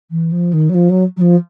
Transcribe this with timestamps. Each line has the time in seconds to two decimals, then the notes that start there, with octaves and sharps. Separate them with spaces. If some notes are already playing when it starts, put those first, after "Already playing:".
0.10 E3
0.31 F3
0.53 D#3
0.69 F#3
0.74 F3
0.89 F#3
1.16 F#3
1.21 F3